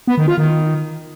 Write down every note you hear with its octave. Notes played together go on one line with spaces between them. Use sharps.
B3
D#3
F4
D#3